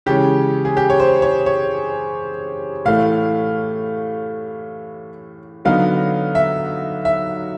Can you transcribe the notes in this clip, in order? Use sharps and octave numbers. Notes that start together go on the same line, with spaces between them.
C#3 E3 G#3 C#4 G4
G#4
G4
C#5
C5
C#5
C#5
A2 E3 A3 F5
D3 F#3 B3 D#4 F5
E5
E5